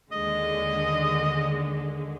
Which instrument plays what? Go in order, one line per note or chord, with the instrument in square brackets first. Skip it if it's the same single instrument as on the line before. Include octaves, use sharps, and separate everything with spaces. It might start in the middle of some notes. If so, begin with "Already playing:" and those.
[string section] D#2 D3 G#3 [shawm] D#5